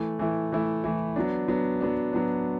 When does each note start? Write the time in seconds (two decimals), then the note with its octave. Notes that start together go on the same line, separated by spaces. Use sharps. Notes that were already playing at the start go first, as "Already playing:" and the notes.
Already playing: E3 A3 E4
0.19 E3 A3 E4
0.52 E3 A3 E4
0.84 E3 A3 E4
1.16 F#3 B3 D4
1.48 F#3 B3 D4
1.81 F#3 B3 D4
2.13 F#3 B3 D4